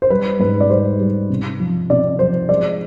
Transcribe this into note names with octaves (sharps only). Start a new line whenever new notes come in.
C5
G3 B4
G#2 B4
D5
G3 C5
G3
C3
F3
C3 D5
F3 C5
G#3 D5